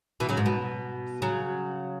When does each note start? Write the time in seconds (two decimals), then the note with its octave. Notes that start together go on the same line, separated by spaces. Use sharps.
0.20 B2 E3
0.29 C#3 F#3
0.37 G#2
0.46 B2
1.22 C#3 F#3